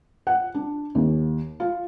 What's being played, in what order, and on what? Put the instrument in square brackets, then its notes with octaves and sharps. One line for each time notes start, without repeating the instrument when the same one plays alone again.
[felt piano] F#5
D4
D#2
F4